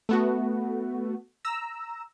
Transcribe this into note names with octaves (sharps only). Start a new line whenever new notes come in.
A3 B3 F#4
A#5 E6